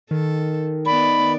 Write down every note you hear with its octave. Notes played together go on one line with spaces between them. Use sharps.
D#3 A4
B3 D5 B5